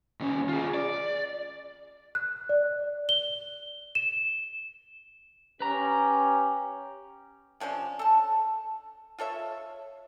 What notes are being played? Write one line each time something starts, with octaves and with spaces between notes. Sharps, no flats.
D#2 C#4
F4 G#4
D5
F#6
D5
G7
E7
C#4 G4 B4 A#5
C3 F3 C#4 D4
A4 A5
F4 A4 C#5 E5